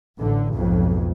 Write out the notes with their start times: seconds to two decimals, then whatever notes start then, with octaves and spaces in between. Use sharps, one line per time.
0.19 A1 D3
0.54 B1 F2 G#2